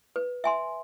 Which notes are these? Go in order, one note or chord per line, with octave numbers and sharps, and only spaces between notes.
B4
E5 G#5 C6